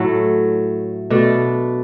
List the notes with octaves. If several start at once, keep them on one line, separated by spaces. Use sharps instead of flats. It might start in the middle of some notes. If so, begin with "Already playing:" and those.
Already playing: A2 F#3 A3
B2 A3 D4